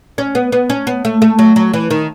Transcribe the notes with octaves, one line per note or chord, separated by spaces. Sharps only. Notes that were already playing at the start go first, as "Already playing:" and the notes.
C#4
B3
B3
C#4
B3
A3
A3
F#3
F#3
E3
D#3